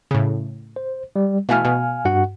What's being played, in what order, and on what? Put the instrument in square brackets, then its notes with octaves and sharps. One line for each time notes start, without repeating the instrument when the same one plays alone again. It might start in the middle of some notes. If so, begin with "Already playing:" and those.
[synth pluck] A2 C#3
[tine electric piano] C5
G3
[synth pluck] B2 E3 A3 [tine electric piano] F5 G#5 F6
[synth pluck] B2
[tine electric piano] G2 F#4 F#5